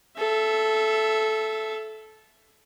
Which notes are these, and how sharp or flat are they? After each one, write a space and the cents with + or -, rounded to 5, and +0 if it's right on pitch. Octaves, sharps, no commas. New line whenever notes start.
A4 -15 E5 +10